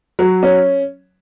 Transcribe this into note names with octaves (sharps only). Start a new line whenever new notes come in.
F#3
C#4